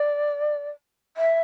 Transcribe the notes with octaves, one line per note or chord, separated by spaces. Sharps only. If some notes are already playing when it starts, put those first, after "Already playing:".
Already playing: D5
E5